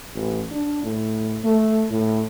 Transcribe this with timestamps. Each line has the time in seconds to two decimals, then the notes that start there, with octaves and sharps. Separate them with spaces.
0.14 A1
0.51 D4
0.83 A2
1.44 A3
1.90 A2